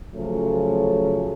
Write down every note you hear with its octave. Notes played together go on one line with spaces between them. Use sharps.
C#3 F3 F#3 A3